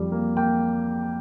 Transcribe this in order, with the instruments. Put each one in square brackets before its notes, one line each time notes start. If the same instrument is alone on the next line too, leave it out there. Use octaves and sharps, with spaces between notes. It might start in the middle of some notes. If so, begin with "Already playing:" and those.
Already playing: [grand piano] F2 G3
A#3
A#3 G5